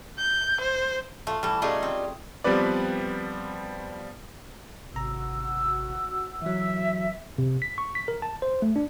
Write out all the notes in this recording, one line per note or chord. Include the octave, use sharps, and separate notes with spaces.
G6
C5
A3 F4
E3 G3 A4
C#3 G3 A3 D#4 F4 G#4
C4
F3 G3 B3 C4 B4 D5
G#1 C3 F#4 A#5 E6
E3 F#3 E5
C3
B6
C#6
B6
A#4
A5
C5
A3
D4